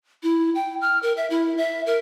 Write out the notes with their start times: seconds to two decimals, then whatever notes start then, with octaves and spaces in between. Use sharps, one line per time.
0.23 E4
0.55 G5
0.81 F6
1.03 A#4
1.17 E5
1.30 E4
1.57 E5
1.86 A#4